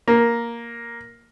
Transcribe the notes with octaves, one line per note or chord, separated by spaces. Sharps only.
A#3